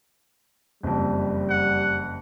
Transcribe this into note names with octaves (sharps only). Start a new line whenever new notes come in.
F#1 F2 G3
F#5